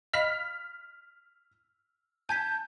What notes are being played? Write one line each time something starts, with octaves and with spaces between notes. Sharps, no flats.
D#5 F5 B5 F6 B6 F7
G#5 A5 G6 G#6 B6